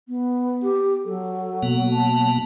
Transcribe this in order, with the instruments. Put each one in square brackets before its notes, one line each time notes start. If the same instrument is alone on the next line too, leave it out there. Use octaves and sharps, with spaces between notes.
[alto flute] B3
[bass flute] G4
[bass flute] F#3 [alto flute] A4
[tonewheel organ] B2 A#3 B3
[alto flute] A5